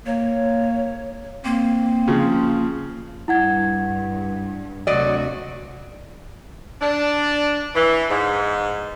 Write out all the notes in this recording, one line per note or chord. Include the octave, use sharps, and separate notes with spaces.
A#3 C#5
A#3 C4
C#3 F3
G2 E4 F#5 G#6
D2 C3 F#3 F#4 D5 D#5
D4
E3
G#2